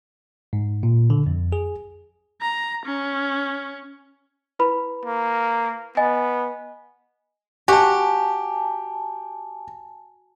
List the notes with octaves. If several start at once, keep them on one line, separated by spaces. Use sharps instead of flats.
G#2
A#2
D3
F2
G#4
A#5
C#4
E4 B4 B5
A#3
B3 D#5 G#5
F#4 G4 G#5 A5